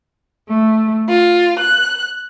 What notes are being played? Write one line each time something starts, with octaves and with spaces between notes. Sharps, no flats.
A3
F4
F#6